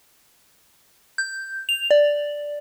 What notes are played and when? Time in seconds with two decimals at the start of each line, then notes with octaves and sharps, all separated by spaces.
1.18 G6
1.69 F7
1.91 D5